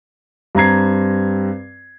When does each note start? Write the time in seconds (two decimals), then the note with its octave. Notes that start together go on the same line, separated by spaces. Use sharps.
0.55 G2 C4 A#5 G#6 C7